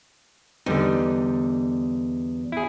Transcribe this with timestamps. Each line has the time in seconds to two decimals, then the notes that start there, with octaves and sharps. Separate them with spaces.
0.66 E2 D3 G3 D#4
2.52 E4 G#4